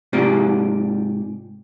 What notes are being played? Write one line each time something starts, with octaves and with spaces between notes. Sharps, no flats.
G#2 C3 F4 G4 D5